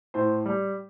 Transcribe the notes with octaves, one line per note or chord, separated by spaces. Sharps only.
A2 C5
G3